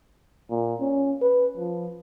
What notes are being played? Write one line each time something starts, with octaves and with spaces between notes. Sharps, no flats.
A#2
C#4
B4
F3